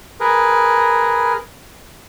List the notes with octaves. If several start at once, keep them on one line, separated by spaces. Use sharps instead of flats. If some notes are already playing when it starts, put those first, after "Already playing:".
G#4 A#4 B4